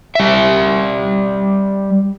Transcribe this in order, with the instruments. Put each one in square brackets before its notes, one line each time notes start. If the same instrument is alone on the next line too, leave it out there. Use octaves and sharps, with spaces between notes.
[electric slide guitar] G3 E5